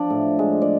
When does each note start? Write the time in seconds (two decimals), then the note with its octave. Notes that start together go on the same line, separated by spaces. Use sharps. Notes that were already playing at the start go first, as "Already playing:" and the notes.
Already playing: F3 D4 D5
0.10 A2
0.39 G#3
0.62 D5